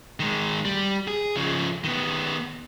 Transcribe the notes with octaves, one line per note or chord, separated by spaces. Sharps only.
D#3 G#3
G3
G#4
C#3 F3
D#3 B3